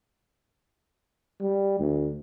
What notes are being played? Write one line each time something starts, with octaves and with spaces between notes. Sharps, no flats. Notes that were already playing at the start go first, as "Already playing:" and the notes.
G3
D2